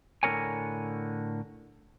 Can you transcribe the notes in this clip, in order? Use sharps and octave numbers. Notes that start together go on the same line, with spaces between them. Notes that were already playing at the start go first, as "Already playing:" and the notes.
A2 D3 C4 A#4 C#5 G#5